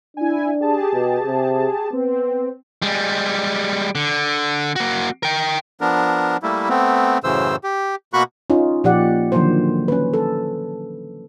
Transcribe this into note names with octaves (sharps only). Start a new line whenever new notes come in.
D4 E4 G#5
G4 G#4 A5
B2
C3
B3 C4
G3 G#3
D3
A#3 F#4
A#4 G5
F3 B3 D4 A#4
G3 A3 A#3 E4
A3 B3 C4
F#2 A2 C#3 E3 C5 E6
G4
B2 A#3 F#4 B5 C#6 F#6
C#4 D#4 F4
A#2 F3 G4 D5 F#5
D3 D#3 F3 F#3 A#3 C5
C#4 B4
A4